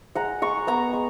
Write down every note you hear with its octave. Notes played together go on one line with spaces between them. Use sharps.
G#3 F#5 A#5
G#3 A#5 C#6
B3 F#5 A#5
G#3